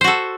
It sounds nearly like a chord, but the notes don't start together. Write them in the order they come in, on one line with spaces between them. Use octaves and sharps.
C5 F#4 A4